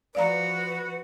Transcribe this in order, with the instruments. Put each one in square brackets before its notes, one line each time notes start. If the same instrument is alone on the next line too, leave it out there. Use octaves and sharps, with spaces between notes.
[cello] F3 F#4 [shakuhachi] B4 [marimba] D5 F5 A#5